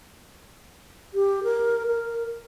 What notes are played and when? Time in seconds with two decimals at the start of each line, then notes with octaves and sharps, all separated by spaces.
1.14 G4
1.44 A#4
1.87 A#4